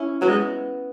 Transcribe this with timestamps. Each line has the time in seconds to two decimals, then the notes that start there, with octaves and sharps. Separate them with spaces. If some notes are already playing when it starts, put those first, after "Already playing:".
Already playing: C#4 E4
0.22 F#3 B3
0.29 G#3